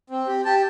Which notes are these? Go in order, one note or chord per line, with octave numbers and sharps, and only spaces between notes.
C4
G4
G4 A5